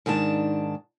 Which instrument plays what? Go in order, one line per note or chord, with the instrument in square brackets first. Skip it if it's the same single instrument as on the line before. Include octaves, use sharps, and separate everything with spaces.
[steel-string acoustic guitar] G#2 D#3 D4 A5